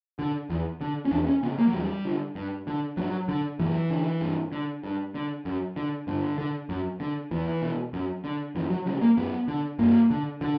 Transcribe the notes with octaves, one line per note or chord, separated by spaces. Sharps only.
D3
E2
D3
C#4
E2 D4
C#4
C#3 B3
A#3
F#3
E2 G3
D3
G2
D3
G2 F#3
D3
F#2 E3
D3
G2
D3
G2
D3
F#2
D3
G2 D3
D3
F#2
D3
E2 E3
B2
F#2
D3
F#2 E3
F#3
C#3 G3
A#3
F#2 B3
D3
G2 A#3
D3
D3